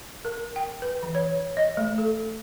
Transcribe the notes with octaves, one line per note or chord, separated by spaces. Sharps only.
A#4
G5
B4
E3
C#5
D#5
A3
A4